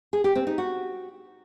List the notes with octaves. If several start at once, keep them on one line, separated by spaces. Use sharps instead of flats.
G#4
G4
C4
D#4
F#4